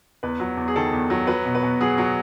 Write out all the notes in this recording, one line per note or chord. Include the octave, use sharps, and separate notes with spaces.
E2 B4
F#3
E2
G#4
D#3 A4
E2
F#3
F#3 B4
B2
B4
B2
F#3 G#4
F#3